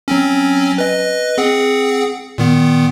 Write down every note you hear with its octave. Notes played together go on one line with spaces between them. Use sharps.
F#3 C4 C#4
B4 D#5
C4 G#4 F#5
A#2 D#3 B3